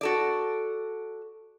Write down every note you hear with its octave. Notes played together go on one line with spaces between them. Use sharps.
F#4 A4 D5